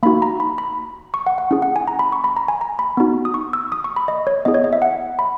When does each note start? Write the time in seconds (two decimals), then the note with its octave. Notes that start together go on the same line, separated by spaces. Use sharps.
0.03 A#3 D#4 F#4 B5
0.22 A#5
0.40 B5
0.58 B5
1.14 C#6
1.27 F#5
1.38 F#5
1.51 C#4 E4 G#4
1.62 F#5
1.76 G#5
1.87 A#5
1.99 B5
2.12 C#6
2.24 B5
2.37 A#5
2.48 G#5
2.61 A#5
2.79 B5
2.97 B3 D#4 F#4
3.25 D#6
3.34 C#6
3.53 E6
3.72 D#6
3.84 C#6
3.96 B5
4.08 D#5
4.27 C#5
4.45 B3 E4 G#4 D#5
4.54 C#5
4.64 D#5
4.73 E5
4.82 F#5
5.19 B5